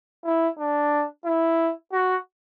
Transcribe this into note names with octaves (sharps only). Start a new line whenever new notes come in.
E4
D4
E4
F#4